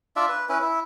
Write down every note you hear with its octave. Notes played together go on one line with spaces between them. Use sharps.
D4 F4 D5 E5
B4
C#4 E4 B4
E4